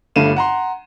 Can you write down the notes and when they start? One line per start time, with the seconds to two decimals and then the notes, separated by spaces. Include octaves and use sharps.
0.16 G1 G2 A3 F5 D#7 E7
0.36 F#5 A#5 C6